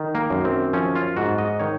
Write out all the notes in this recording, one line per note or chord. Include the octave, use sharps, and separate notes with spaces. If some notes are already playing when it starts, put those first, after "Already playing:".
Already playing: D#3
A#3
F#2
C4
F3 C#4
F4
G#2 F#4
D#5
D#3 C#5